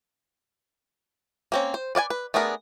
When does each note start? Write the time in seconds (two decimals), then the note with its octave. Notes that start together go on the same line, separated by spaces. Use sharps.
1.52 A#3 C4 C#4
1.74 C5
1.95 B4 D5 F5 G#5
2.10 B4
2.34 A3 B3 D4 G#4 A#4